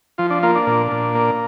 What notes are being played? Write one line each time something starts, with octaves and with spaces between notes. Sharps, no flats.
F3 F4
D4
A#3 F4
D4
A#2
A#2
A#3